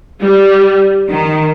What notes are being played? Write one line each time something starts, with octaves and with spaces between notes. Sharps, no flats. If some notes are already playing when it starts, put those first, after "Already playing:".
G3
D#3